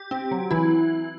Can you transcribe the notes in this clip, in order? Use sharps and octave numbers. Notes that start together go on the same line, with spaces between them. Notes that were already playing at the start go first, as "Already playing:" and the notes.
Already playing: G4
C4
F#3
E3 E4